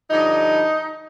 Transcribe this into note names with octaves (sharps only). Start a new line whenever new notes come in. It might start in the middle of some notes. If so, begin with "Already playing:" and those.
G2 D3 F3 D#4